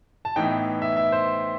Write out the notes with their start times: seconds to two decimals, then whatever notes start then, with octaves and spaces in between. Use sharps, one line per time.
0.25 A5
0.36 A2 E3 B3 D#4 G5
0.82 E5
0.97 E5
1.12 C5